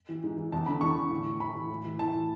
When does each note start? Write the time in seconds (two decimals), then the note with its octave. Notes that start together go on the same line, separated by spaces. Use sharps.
0.09 E3
0.23 G#2
0.37 E3
0.52 E2 A5
0.66 D3 B5
0.81 E2 C#6
0.96 D3
1.10 A2
1.26 E3
1.40 A2 B5
1.55 E3
1.70 A2
1.85 E3
1.99 A2 A5
2.14 E3